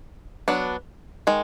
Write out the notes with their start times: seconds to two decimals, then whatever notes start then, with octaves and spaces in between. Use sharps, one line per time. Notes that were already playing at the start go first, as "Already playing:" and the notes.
0.48 F#3 B3 D4
1.27 D#3 G#3